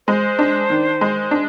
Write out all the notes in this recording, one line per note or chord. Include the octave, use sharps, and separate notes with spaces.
G#3 C5
D4
D#3
G#3
D4